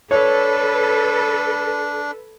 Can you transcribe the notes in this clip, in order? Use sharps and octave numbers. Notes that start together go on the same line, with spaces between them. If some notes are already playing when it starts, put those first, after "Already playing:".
D4 A4 B4 C#5